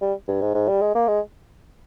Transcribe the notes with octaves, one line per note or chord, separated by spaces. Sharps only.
G3
G2
G#2
G#2
G3
G#3
A#3
G#3